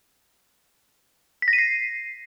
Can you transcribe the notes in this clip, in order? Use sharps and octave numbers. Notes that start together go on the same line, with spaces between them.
B6
A#6
D#7
C7